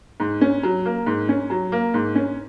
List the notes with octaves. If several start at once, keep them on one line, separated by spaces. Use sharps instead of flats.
G#2
C#4
F#3
A#3
G#2
C#4
F#3
A#3
G#2
C#4